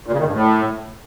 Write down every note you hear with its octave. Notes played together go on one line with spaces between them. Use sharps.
A#2
C#3
D#3
G2
A2